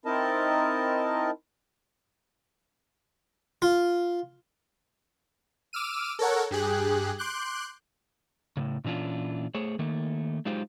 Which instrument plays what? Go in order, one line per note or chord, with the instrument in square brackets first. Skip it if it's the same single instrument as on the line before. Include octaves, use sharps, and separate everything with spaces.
[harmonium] C4 D#4 E4 A#4 D#5 A5
[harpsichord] F4
[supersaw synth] D6 E6 F6 D#7
A4 A#4 C#5 F#5
G2 G4 G#4 F#6
C6 D6 F#6 G6
[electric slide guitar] A2 C#3
A#2 E3 C#4 D4 F4
A3 G#4 C5 C#5
D#3 A3 A#3
F#3 G#3 D#4 F4 G4 C5